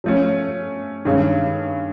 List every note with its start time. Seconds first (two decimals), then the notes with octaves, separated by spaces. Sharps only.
0.04 F3 A3 C#4
1.05 G2 D#3 G#3 C#4